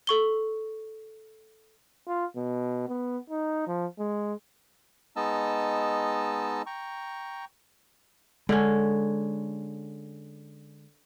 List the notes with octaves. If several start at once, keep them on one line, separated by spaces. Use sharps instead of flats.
A4 C#6 G7
F4
B2
B3
D#4
F3
G#3
G#3 B3 D#4 D#5 A5 E6
G5 A#5 C#6
D3 G#3 C#4